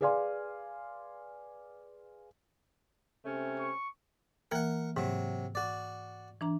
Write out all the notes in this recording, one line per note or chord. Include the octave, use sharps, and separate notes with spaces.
G#4 B4 D5 F5 G#5 C6
C3 A3 C#4
C#6
E3 A#3 A#4 F#5 G5
G#2 C3 F#3
F#4 D5
E3 D4 A#5